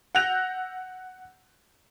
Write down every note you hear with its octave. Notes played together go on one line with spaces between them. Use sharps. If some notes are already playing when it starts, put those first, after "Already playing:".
F#5 E6 F#6 G6 A#6 F7